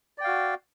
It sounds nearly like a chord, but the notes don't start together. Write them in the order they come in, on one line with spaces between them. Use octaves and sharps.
D5 G5 F5 F#4